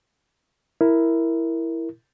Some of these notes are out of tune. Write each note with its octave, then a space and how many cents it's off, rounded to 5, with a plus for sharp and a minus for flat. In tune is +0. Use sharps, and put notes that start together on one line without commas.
E4 +0 A#4 +0